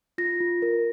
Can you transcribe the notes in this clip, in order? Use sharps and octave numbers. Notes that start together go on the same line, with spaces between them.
F4 A#6
F4
A#4